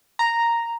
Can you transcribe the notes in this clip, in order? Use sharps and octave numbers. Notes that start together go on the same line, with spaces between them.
A#5